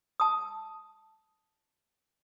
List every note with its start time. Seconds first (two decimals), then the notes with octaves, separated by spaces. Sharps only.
0.20 A5 D#6